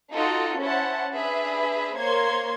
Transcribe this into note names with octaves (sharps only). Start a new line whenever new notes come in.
D#4 F4 F#4 A4
C#4 E4 C5 F#5 A5
D4 G#4 B4 E5 B5
A#3 C5 C#5 C6 G#6